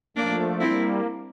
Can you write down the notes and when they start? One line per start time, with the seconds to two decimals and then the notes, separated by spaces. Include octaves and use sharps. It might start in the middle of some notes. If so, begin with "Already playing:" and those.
0.16 F3 A3 A#3 D4
0.60 G3 A#3 C4 E4